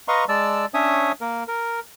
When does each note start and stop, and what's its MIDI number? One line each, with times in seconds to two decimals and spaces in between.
0.08 0.25 71
0.08 0.25 75
0.08 0.25 77
0.08 0.25 82
0.08 0.25 84
0.08 0.25 85
0.29 0.66 56
0.29 0.66 74
0.29 0.66 81
0.29 0.66 88
0.74 1.12 61
0.74 1.12 62
0.74 1.12 73
0.74 1.12 76
0.74 1.12 87
1.21 1.43 58
1.21 1.43 70
1.48 1.80 70